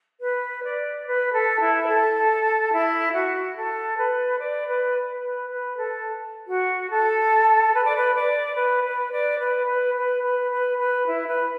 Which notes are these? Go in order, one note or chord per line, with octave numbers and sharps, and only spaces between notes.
B4
D5
B4
A4
E4
B4
A4
E4
F#4
A4
B4
D5
B4
B4
B4
A4
F#4
A4
B4
D5
B4
D5
B4
B4
D5
B4
B4
B4
B4
B4
B4
E4
B4